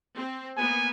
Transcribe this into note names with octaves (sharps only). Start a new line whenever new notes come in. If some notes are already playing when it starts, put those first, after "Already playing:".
C4
A#3 B3 G#5